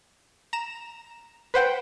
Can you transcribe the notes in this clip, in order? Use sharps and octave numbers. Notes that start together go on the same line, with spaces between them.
A#5 E7
B4 C5 F#5 G5